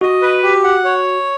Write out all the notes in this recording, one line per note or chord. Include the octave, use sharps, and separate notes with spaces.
F#4 D#5
B4
G4
F#5
C#5